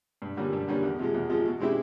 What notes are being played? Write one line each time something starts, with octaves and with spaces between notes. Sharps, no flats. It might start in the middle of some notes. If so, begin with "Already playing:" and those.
G2
D3 G3 A#3 C#4
G2
D3 G3 A#3 C#4
E2
C3 F3 G#3
E2
C3 F3 G#3
B2
G#3 C4 E4 G4